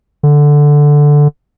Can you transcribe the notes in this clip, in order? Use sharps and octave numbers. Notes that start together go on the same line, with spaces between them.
D3